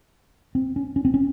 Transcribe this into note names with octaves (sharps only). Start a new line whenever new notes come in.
C4
C#4
C#4
C4
C#4